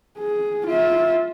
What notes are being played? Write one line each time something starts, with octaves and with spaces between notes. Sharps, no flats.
G#4
F4 E5